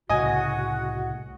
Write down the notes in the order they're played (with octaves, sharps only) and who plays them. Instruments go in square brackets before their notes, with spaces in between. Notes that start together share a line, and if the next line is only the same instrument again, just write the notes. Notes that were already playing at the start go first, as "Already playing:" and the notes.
[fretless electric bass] C2 A2 C#3 [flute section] F#4 [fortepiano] D#5 G#5